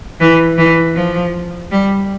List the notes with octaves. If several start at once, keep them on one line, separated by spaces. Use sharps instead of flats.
E3
E3
F3
G3